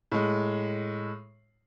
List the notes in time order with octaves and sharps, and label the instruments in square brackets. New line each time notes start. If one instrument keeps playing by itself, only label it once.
[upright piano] A2 G#3